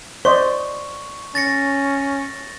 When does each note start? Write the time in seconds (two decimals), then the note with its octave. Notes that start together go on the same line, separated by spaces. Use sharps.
0.25 C5 D5 D#5 C#6
1.35 C#4 A6 A#6 C#7